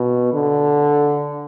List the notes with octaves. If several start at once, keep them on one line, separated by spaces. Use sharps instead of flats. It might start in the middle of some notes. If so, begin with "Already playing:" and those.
Already playing: B2
D3